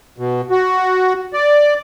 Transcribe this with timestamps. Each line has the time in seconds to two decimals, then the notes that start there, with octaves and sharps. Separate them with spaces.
0.18 B2
0.50 F#4
1.33 D5